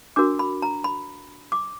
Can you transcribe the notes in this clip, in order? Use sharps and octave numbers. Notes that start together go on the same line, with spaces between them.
D4 F#4 A#4 D6
B5
A#5
B5
D6